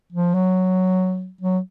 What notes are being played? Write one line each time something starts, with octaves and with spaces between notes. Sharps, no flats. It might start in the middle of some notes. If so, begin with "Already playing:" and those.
F3
F#3
F#3